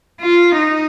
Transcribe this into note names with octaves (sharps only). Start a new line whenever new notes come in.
F4
D#4